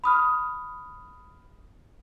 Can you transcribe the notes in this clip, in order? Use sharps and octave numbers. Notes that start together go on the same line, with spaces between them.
B5 D#6 F6